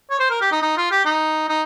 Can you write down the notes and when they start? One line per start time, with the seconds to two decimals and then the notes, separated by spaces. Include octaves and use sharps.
0.10 C#5
0.19 C5
0.30 A#4
0.41 G4
0.52 D#4
0.62 D#4
0.77 F4
0.91 G4
1.05 D#4
1.49 D#4